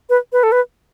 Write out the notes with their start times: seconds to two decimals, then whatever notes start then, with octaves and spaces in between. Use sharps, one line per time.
0.10 B4
0.32 B4
0.43 A4
0.52 B4